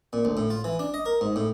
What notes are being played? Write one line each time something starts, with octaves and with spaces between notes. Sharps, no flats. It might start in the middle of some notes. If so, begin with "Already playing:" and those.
A#2
D2
A2
F4
E3
D4
D#5
A#4
G#2
A2